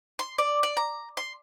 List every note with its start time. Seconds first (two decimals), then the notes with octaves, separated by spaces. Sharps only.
0.19 C6
0.38 D5
0.63 D5
0.77 A#5
1.17 C6